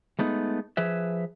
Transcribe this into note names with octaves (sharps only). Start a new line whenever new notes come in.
G#3 A3 B3 D#4
F3 G#4 B4 E5